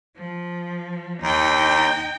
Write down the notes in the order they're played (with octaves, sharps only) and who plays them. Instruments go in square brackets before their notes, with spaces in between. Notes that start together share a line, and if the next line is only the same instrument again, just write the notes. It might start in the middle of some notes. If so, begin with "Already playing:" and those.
[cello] F3
[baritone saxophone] D#2 [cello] D#4 G5